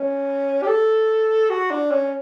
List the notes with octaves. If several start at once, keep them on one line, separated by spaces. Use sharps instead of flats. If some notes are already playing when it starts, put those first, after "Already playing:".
Already playing: C#4
G4
A4
F#4
D4
C#4